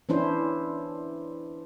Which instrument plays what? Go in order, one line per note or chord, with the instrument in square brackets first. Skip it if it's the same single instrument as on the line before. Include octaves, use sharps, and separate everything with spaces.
[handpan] E3 C#4 D4 E4 C5